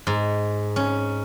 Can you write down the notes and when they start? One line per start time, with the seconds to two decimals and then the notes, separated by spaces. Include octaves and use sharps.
0.07 G#2
0.76 C#4